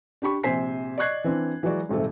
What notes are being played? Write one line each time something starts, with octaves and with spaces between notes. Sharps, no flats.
D4 G4 B5 C#6
A#1 C3 C5 G#5 B6 C7
D5 D#5 C#6 F#6 G#6 C7
E3 C4 D4
E3 F#3 G#3 F#4 D5
D#1 G#1 C3 A3